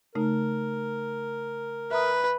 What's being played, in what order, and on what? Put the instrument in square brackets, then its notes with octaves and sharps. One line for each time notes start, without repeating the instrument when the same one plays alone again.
[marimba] C#3 A3 D#4 [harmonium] A#4
[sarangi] B4 [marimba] E5 A#5 D#6